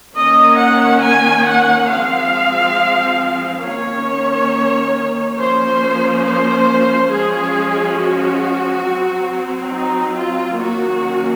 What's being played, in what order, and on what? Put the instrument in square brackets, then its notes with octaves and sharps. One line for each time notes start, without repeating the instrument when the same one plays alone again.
[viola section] D#3 A#3 C#4 D#5
F#5
G#5
F#5
F3 G#3 C4 F5
D#3 A#3 C#4 C#5
F3 A#3 C#4 C5
C5
F3 G#3 C#4 G#4
F#4
F#3 C4
D#4
F4
D#3 F#3 A#3 C#4 F#4